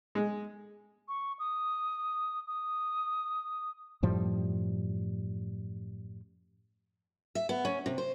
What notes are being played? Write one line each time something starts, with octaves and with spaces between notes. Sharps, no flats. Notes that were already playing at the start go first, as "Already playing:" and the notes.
G#3
C#6
D#6
D#6
F#2 A2 F3 G3
E5
B3
C#4
C3
C5